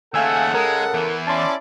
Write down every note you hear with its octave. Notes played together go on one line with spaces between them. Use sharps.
D#2 C#3 A3 A4 F5 F#5 G#5 E6
G#3 A#4
E2 E3
C#4 E4 D5 A5 C6